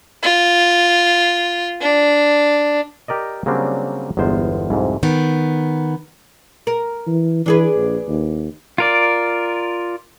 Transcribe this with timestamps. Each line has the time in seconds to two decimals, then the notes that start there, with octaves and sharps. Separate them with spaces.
0.23 F4
1.81 D4
3.08 G4 A#4 D5 D#5
3.46 C#3 F#3 G3 A#3 C4 D4
4.17 G1 E2 G#3 F4 C5
4.70 C2 F2 G#2
5.03 D#3 B3
6.67 A#4
7.07 E3
7.46 E3 D4 G#4 B4
7.76 A#1
8.07 D#2
8.78 F4 A#4 D5